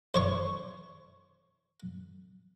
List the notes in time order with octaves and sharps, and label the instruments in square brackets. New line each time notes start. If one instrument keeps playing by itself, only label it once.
[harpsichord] C5 C#5 C#6